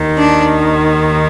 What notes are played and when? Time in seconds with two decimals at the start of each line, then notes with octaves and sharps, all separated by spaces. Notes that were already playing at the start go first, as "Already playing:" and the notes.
Already playing: D#2 D#3
0.17 D4